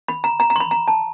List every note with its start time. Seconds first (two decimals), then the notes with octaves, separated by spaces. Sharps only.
0.08 B5
0.24 A#5
0.40 A#5
0.50 A#5
0.56 C6
0.60 B5
0.71 A#5
0.88 A5